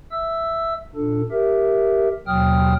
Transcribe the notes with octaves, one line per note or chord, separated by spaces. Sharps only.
E5 E6
A#2 D4 A4
G4 A#4 E5
D#2 B2 F#3 G5 D#6 F6